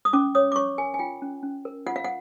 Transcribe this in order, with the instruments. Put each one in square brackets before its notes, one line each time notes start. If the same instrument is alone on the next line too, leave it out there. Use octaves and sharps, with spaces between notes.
[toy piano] D#6
C#4 D6
C#5 D#6
D6
C#5 C#6
A#4 G#5
G#5
F4 G5
C#4
C#4
A#4
F4 F#5
F5
F#5